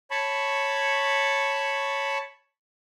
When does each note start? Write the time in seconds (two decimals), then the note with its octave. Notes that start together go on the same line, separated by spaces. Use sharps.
0.11 C#5 A5 B5 C#6